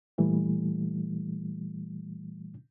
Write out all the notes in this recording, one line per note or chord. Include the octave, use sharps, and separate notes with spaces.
A#2 E3 G3 A3